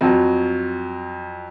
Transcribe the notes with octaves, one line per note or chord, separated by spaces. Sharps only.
F2 F#3